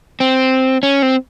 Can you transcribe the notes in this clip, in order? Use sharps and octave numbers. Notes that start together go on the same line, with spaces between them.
C4
C#4
C4